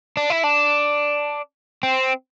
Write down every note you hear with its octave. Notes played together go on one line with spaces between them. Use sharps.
D4
E4
D4
C4